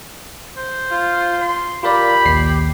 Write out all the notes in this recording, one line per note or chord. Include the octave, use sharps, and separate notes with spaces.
C5
F4
C6
F4 G4 A#4 D5 B5
A#1 D#2 C7